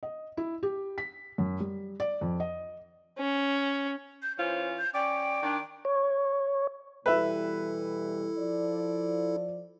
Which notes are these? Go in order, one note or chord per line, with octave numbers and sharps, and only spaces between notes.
D#5
E4
G4
B6
F#2
G3
D5
F2
D#5
C#4
G6
E3 C#4 F4 C5
G6
C#4 D5 G5
D#3 D4
C#5
B2 E3 G3 E4 A4 B4 E5
F3 D5